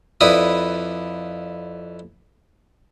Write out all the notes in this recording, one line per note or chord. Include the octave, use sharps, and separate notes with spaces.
F2 E4 B4 D5 D#6